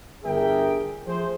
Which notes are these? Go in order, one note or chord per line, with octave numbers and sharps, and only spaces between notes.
G1 D4 G#4 A#4 E5 G5
F3 A3 G#4 C5